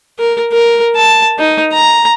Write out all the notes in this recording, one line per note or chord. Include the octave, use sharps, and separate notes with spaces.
A#4
A#4
A5
D#4
A#5